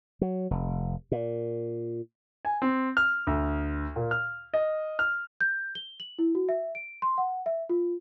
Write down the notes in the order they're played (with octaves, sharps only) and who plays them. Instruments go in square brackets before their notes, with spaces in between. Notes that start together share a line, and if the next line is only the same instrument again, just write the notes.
[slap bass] F#3
F1
A#2
[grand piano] G#5
C4
F6
D2
A#2
F6
D#5
F6
[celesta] G6
G7
F#7
E4
F#4
E5
D7
C6
F#5
E5
F4